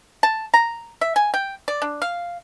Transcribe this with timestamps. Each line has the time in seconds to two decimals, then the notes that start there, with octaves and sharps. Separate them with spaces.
0.23 A5
0.54 A#5
1.01 E5
1.16 G#5
1.34 G5
1.68 D5
1.82 D4
2.02 F5